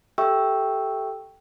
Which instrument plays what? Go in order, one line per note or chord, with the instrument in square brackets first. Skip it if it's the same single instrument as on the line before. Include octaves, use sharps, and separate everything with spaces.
[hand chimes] G4 A4 E5 G5 C#6 E6